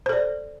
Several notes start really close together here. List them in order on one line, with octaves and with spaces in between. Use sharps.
C5 A4 D5